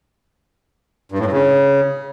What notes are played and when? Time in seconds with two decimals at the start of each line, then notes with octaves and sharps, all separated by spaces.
1.12 G2
1.19 A2
1.26 G2
1.32 C#3